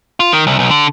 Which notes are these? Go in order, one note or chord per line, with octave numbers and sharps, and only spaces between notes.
F4
D#3
C2
B1
D3